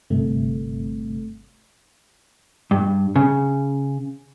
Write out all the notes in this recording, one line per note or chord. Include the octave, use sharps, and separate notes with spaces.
G1 G2 C3 A3
G2
C#3